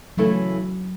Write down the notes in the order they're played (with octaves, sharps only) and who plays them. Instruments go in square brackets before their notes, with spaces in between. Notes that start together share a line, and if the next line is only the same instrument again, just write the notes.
[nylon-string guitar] C#3 E3 A3 E4 A4 [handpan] F#3